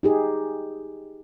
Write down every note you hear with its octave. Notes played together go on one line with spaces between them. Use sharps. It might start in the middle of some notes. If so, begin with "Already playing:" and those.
D#4 G4 G#4